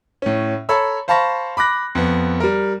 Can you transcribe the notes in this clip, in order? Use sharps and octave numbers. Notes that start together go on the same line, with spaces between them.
A2 C#4
A4 C#5 A#5 B5 E6
C5 F5 A5 B5 C#6 A#6
B5 D6 F#6 A#6
F2 B3
G3 A#4